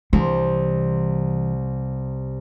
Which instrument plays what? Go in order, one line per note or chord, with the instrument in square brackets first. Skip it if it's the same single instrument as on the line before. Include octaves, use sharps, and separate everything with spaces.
[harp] C2 [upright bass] E3